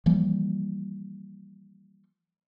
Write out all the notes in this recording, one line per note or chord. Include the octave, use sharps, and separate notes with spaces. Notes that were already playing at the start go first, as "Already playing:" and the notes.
E3 F3 G3 A#3